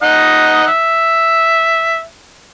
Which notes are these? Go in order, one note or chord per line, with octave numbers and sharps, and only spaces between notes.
D#4 D#5 F#5
E5